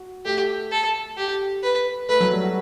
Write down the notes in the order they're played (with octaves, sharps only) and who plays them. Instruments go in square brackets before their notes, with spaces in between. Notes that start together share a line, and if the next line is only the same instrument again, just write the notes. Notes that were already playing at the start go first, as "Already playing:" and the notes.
Already playing: [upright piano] F#4
[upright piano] A3 [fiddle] G4
[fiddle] A4
G4
B4
[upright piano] A3 [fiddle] B4
[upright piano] F#3
G3
F#4